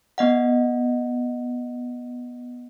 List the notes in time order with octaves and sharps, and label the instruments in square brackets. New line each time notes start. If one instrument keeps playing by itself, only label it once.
[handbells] B3 D#5 F#5